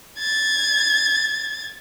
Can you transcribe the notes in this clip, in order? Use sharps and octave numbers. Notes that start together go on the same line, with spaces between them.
G#6 A6